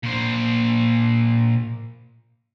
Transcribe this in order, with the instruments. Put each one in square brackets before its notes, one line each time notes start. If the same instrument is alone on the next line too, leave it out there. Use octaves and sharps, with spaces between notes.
[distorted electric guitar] A#2 C5